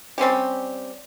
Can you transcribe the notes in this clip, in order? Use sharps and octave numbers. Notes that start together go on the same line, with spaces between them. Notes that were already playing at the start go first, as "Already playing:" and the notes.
G3 C4 C#4 G4